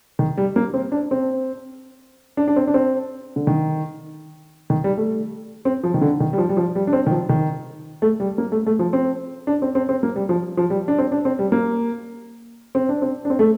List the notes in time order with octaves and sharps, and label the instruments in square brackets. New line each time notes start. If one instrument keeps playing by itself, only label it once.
[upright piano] D#3
G3
A#3
C4
D4
C4
D4
D4
C4
D4
C4
D3
D#3
D#3
G3
A3
C4
F3
D#3
D3
D#3
G3
F3
G3
F3
G3
D4
C4
D#3
F3
D#3
A3
G3
A#3
A3
A3
F3
C4
D4
C4
C4
C4
A#3
G3
F3
F3
G3
D4
C4
D4
C4
G3
A#3
C4
D4
C4
D4
C4
A3